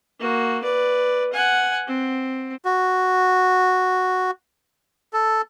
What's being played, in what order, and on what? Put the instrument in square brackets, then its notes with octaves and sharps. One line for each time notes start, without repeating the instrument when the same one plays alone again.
[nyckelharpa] A#3 F#4
B4 D5
F#5 G#5
C4
[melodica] F#4
A4